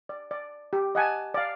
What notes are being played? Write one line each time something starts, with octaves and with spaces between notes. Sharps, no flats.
D5
D5
G4
D#5 F#5 G#5 A5
D5 F5